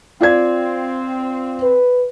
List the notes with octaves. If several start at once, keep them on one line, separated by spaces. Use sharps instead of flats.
C4 F4 D5 G#6
B4